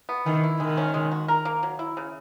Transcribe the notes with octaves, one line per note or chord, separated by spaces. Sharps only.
B3
D#3 E3
E4
D#3 G#3
C#4
G#3
F#4
A#4
A#3
F#3
E4
C#3